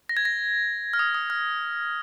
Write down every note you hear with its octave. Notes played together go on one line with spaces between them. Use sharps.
A#6
G#6
A#6
F6
D#6
D#6
F6